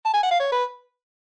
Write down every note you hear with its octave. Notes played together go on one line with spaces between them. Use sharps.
A5
G#5
F#5
F5
C#5
B4